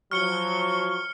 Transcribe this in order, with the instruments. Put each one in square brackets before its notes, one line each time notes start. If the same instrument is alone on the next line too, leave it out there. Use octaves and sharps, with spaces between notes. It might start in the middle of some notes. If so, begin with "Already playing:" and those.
[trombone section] F3 F#3 [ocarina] C#6 [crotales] F6 C#7 G7